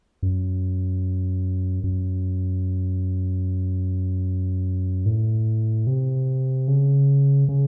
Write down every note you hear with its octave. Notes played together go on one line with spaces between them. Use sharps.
F#2
F#2
A2
C3
C#3
C#3